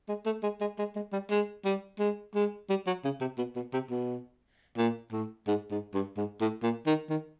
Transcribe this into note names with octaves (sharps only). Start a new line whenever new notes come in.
G#3
A3
G#3
G#3
G#3
G#3
G3
G#3
G3
G#3
G#3
G3
F#3
C#3
C3
B2
B2
C3
B2
A#2
A2
G#2
G#2
G2
G#2
A2
A#2
D#3
D#3